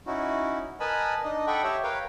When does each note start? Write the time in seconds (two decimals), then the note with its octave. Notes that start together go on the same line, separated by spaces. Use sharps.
0.07 C#4 D#4 E4 F#4
0.80 A#4 B4 D#5 G#5 A5 B5
1.24 D4 D#4 D#5
1.47 A4 D#5 F#5 G5 B5 C#6
1.63 G4 C#5 E5
1.83 A#4 B4 C#5 F5 G5